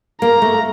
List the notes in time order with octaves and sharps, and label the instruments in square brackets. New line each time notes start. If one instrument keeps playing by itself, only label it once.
[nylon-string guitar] A#3 [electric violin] A#5
[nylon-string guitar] A3